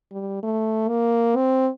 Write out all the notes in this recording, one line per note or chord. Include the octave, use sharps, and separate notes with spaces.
G3
A3
A#3
C4